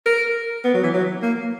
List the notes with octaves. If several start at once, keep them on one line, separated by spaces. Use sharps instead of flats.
A#4
B3
F#3
E3
F#3
A#3